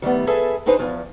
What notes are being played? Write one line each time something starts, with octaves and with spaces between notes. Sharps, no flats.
D#3 G3 A3 B3
G#4 A4 B4 E5 A5
E2 D4 D#4 G#4 B4 C5
E2 F3